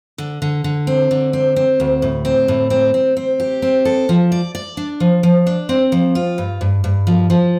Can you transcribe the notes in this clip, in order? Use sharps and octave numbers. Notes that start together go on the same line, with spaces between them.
D3
D3
D3
C4
D3
C4
C4
D2
A2
C4
A2
C4
C4
C4
G4
C4
A4
F3
D5
D5
D4
F3
F3
D4
C4
F3
F4
G2
G2
G2
F3
F3